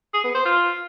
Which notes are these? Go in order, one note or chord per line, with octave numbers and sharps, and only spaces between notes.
G#4
B3
C5
F4